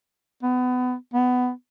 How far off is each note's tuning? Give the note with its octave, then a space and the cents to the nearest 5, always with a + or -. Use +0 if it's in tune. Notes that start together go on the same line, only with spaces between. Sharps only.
B3 +25
B3 +15